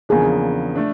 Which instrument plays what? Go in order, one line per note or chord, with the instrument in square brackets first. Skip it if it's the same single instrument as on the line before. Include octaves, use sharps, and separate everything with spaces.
[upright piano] E2 C#3 F3 A#3 D4 [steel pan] G#4
[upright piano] A3 D4